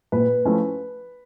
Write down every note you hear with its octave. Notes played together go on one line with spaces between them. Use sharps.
A#2 B4
F3 A3 C#4 E4